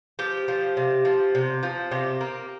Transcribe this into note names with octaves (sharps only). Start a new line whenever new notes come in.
F3 G4
F3
C3
F3
C3
F3
C3 G4
A#3